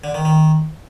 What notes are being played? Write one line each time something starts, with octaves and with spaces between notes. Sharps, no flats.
D3
D#3
D#3